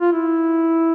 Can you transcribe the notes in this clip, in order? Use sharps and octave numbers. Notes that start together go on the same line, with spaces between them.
F4
E4